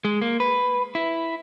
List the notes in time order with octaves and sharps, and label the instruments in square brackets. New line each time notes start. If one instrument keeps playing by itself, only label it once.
[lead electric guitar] G#3
A#3
B4
E4